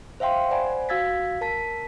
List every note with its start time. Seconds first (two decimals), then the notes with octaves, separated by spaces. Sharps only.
0.20 C5 E5 F5 G5 C6
0.51 C5 D5 F#5 G#5 B5
0.89 F#4 F5 E6 G#6 A6 B6
1.41 A#4 A5 B6